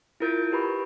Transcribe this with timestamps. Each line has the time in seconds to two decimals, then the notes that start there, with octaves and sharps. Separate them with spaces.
0.20 E4 F4 A#4 G6 A6 D7
0.52 G4 B4 A#5 B5 C#6